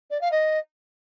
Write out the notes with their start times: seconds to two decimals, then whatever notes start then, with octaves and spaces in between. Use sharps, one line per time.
0.10 D5
0.21 F5
0.31 D#5